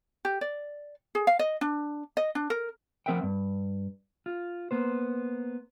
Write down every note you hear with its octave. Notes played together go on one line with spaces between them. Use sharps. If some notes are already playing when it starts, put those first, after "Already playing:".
G4
D5
G#4
F5
D#5
D4
D#5
D4
A#4
F3 C4 A#4 E5 F#5 G5
G2
F4
A#3 B3 C5